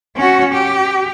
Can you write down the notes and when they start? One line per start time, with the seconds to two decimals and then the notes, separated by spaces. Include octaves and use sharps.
0.16 C#4 F#4
0.54 G4